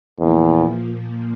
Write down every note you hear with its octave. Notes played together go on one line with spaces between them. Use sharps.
E2 A#2 F3 A#3